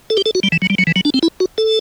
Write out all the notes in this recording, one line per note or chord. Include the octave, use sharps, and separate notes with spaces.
A4
G4
A4
F#4
G3
E3
F#3
G3
F#3
E3
F#3
D4
C4
E4
F#4
A4